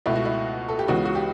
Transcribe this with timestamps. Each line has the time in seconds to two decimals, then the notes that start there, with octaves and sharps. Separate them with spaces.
0.06 C#2 B2 A3 E4
0.16 F#4
0.25 E4
0.68 A4
0.79 G4
0.87 C#2 C#3 E3 B3 F#4
1.05 F#4
1.15 G4